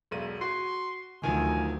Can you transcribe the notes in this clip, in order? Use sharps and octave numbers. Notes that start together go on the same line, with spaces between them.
E1 B1 D#7
F#4 C6
D2 D#3 F3 F#3 G#5